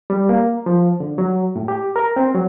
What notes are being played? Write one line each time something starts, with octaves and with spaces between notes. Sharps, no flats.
G3
A#3
F3
D3
F#3
A2
G4
A#4
C4
F#3